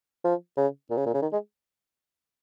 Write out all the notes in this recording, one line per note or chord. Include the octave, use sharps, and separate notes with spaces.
F3
C#3
A#2
C#3
A#2
C#3
D#3
G#3